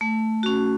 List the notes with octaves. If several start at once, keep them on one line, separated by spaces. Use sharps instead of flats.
A3
C#4 F#4